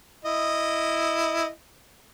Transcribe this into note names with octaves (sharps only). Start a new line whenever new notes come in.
E4 D#5